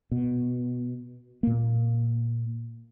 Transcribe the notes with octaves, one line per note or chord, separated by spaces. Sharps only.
B2
A#2 A#3